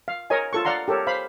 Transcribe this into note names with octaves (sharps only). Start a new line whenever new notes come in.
F5
A#4 C#5 D#5 G#5
F4 A4 C#6
D5 F5 F#5 A#5 C6
G4 A4 A#4 C#5
C5 F5 B5